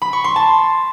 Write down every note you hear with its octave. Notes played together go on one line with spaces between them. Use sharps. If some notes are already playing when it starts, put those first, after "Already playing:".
B5
C#6
C6
A5